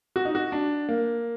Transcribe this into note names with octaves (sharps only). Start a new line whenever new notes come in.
F#4
D#4
F#4
D4
A#3